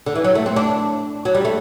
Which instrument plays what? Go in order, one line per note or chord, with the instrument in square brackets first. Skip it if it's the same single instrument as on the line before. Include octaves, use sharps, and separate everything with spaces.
[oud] D3
E3
F#3
A3
C4
D4
F#3
G3
A3